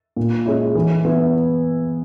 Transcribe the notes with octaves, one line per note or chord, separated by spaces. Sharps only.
A#2
G#3 C#4 E4
E3
B3 E4